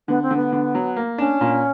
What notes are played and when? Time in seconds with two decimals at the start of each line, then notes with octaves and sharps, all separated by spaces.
0.08 D3 B3
0.22 C4
0.31 D3
0.36 B3
0.52 D3
0.75 F#3
0.96 A#3
1.18 C#4 D4
1.41 A#2